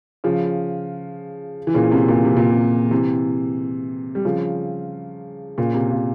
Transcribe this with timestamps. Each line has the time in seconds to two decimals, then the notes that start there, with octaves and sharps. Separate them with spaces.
0.24 C#3 F3
1.67 E3
1.74 A#2 C#3
1.92 C3
2.08 A#2
2.25 C3
2.37 A#2
2.50 C3
2.91 C3 E3
4.15 G3
4.25 C#3 F3
5.58 A#2 C#3
5.74 C3
5.92 A#2